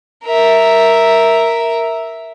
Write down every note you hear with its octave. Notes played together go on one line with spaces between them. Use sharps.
A#4 E5